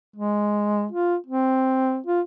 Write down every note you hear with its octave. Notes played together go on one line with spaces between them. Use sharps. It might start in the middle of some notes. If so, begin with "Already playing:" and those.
G#3
F4
C4
F4